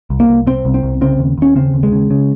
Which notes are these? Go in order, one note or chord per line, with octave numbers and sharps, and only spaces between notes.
C2
A#3
C2
C3 C4
C2
C4
C2
C#3 C4
D#2
D#2 C#4
C#3 C4
D#2
G#3
C#3
C#3